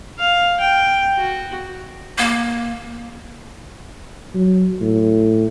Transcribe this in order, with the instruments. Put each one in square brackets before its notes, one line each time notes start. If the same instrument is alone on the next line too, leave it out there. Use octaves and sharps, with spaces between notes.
[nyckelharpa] F5
G5
F#4
[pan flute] A#3
[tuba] F#3
A2